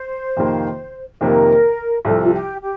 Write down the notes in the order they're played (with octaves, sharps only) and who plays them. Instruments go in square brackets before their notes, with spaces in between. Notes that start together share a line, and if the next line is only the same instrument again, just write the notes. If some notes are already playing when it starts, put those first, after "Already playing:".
Already playing: [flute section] C5
[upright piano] F2 C3 D#3 A#3
[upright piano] F2 C3 D#3 A#3 [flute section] A#4
[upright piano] C2 C3 F3 [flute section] A4
[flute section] F4
G4
G4